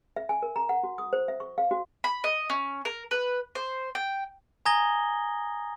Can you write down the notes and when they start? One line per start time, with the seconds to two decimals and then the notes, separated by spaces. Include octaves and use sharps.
0.16 E5
0.29 G#5
0.42 A#4
0.56 A#5
0.69 F#5
0.83 F#4
0.98 D#6
1.13 C5
1.28 E5
1.40 C#6
1.58 F5
1.71 F#4
2.04 B5
2.24 D#5
2.50 C#4
2.85 A#4
3.11 B4
3.55 C5
3.95 G5
4.66 G#5 A#5 D#6 G#6 A#6 G7